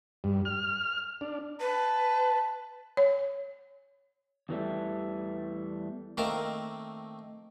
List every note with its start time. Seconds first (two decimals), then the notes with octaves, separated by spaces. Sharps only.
0.24 G2
0.45 F6
1.21 D4
1.60 B4 A5
2.97 C#5
4.49 E2 E3 G3 A3
6.17 D#3 A3 A#3 C4 A#4 A5